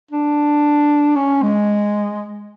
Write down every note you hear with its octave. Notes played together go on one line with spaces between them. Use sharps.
D4
C#4
G#3